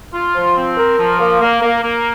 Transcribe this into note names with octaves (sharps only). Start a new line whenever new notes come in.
F4
F3
C4
A#4
F3
A#3
A#3
A#3
A#3